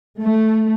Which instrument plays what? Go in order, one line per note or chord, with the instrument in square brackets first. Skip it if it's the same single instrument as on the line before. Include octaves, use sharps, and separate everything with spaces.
[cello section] A3